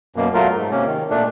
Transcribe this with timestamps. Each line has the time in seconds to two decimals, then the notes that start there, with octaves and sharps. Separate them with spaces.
0.16 F#2 B2 A#3
0.34 F#3 A3 F4 A#4
0.55 G#2
0.71 C3 A#3 C#4
0.86 D#3
1.10 A#2 A3 D4